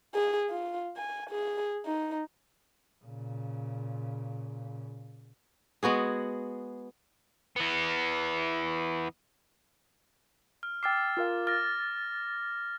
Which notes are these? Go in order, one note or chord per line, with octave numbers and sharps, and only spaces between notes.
G#4
F4
G#5
G#4
D#4
A#2 C#3
G#3 B3 F#4 G#4
E3 B3
F6
G5 D6 E6 F6 A6 C7
F4 A#4 F5
F6 A6 A#6